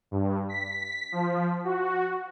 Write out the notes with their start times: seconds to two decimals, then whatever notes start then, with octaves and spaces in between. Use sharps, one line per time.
0.11 G2
0.49 B6
1.12 F3
1.65 F#4